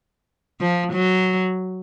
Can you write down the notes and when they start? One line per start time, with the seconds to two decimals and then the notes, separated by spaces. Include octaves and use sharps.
0.61 F3
0.93 F#3